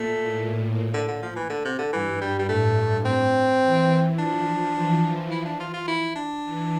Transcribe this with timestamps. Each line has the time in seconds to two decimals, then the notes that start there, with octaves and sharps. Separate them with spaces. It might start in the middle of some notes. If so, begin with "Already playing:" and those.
Already playing: A#2 A3
0.23 A2
0.94 D3
1.08 D3
1.22 F3
1.36 E3
1.50 D3
1.65 C3
1.78 D3
1.93 G2 E3
2.21 G3
2.39 G3
2.49 A2 A3
3.05 C4
3.62 E3
4.19 F3 D4
4.75 E3
5.31 E4
5.45 D4
5.60 F4
5.73 F4
5.88 E4
6.16 D4
6.44 E3